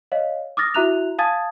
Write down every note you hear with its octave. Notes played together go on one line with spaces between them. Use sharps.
C#5 D#5 F5
D6 D#6 F6 A6 A#6
E4 F#4 E5 A#5 F#6 F7
F5 G#5 A5 D#6 G#6 A6